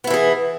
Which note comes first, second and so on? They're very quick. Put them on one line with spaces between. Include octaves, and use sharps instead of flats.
B3 E4 E3 G#4